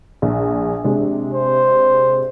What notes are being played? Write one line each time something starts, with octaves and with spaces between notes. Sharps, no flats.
A#1
C3 G#3 D4
C5